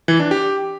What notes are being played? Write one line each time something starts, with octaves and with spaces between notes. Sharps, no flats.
E3
D4
G4